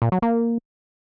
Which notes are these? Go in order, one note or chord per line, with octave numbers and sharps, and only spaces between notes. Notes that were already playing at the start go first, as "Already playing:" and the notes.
A#2
F#3
A#3